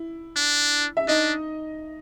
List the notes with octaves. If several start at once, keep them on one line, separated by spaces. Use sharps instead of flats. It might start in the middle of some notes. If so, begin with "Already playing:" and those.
Already playing: E4
D4
E5
D4 D#4 D#5